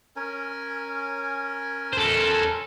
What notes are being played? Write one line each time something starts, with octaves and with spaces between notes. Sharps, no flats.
C#4 A#4 G#5
A4 C5